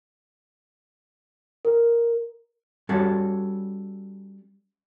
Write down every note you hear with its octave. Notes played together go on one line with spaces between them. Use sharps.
A#4
G3 C#4 F#4 A4 C#5 D5